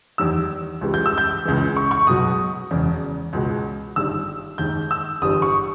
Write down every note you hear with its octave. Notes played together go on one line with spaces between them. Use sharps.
E2 D#3 G3 E6
C#2 C#3 E3 G3
G6
E6
G6
C#2 C#3 E3 G#3
C#6
C#6
B1 B2 G#3 D#6
E1 E2 C#3
C#2 B2 G#3
G1 G2 D#3 G3 E6
D#2 D#3 G#3 G6
E6
G1 G2 E3 G3 D#6
C#6